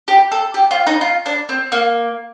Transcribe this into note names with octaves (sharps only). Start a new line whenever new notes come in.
G4
A4
G4
F4
D#4
F4
D4
C4
A#3